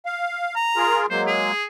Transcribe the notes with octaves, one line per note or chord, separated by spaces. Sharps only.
F5
A#5
F4 G#4 A#4
F#3 G#3 A#3 C5
G#4